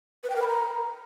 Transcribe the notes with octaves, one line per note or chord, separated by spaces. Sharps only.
B4
G5
A#4
B5
A#5